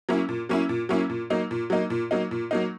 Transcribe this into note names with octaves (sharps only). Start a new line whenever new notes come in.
F#3 A#3 C#4 E4
A#2
F#3 A#3 C#4 E4
A#2
F#3 A#3 C#4 E4
A#2
F#3 A#3 D#4
A#2
F#3 A#3 D#4
A#2
F#3 A#3 D#4
A#2
F#3 A#3 D#4